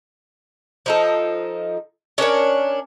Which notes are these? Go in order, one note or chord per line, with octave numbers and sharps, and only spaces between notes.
F3 D#4 A4
C#4 D4 A#4 C#5